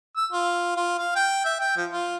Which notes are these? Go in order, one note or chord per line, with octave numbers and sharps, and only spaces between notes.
E6
F4
F4
F5
G5
E5
G5
F3
F4